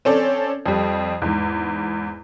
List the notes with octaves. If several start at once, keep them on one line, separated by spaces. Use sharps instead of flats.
C4 C#4 A4 D5
F2 G3
E2 G#2